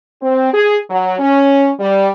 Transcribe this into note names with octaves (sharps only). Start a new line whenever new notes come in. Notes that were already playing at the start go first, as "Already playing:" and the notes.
C4
G#4
F#3
C#4
G3